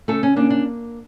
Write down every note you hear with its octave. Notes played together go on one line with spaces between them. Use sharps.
C#3 A3 A4
C#4
A#3 D4
D4